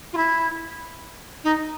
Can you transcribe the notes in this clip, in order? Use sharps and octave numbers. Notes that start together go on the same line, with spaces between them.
F4
E4
D#4